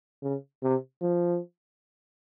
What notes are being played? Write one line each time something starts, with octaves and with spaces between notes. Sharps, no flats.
C#3
C3
F3